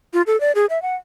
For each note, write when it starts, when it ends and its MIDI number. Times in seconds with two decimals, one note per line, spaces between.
0.14 0.22 65
0.27 0.39 69
0.40 0.52 74
0.55 0.66 68
0.70 0.81 76
0.82 0.95 78